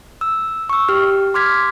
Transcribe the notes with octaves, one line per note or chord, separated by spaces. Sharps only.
E6
C#6 E6
G4 F6
C6 D6 F6 G#6 B6